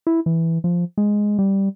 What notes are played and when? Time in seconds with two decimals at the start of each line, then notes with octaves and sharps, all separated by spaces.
0.07 E4
0.26 E3
0.64 F3
0.98 G#3
1.39 G3